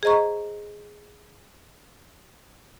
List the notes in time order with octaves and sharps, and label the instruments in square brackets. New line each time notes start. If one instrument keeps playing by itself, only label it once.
[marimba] G#4 C5 D#5 A#5 C#6